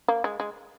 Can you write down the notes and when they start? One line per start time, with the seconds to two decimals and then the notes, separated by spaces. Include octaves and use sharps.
0.08 A#3
0.24 G#3
0.40 G#3